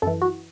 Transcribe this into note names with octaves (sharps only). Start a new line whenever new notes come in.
F#2 E3 A4
F#4